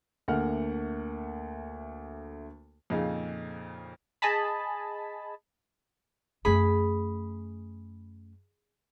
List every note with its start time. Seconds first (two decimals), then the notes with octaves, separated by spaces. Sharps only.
0.28 D2 A3 A#3 F#5 F6
2.90 F2 A#2 C#3 D#4 G#4 F5
4.22 G#4 D#5 G#5 A5 B5
6.45 F#2 A3 G#4 B5